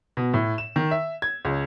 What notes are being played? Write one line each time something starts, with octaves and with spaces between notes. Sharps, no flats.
B2
A2
E7
D#3
E5
G#6
C#2